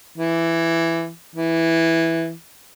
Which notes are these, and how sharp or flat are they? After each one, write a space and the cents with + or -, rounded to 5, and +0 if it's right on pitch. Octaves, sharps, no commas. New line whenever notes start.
E3 +10
E3 +0